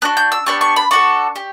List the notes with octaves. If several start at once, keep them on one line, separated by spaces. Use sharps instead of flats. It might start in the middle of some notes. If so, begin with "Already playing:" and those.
B3 D4 F#4 F#6
G6
E6
B3 D4 G4 C#6
C#6
B5
D4 F#4 A4 C#6
G4